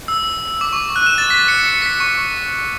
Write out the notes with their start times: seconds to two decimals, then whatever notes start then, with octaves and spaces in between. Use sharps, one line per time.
0.08 E6
0.61 D6
0.73 C#6
0.96 F#6
1.07 E7
1.18 A6
1.30 B6
1.48 C#7
1.66 C#7
1.82 B6
2.00 C#6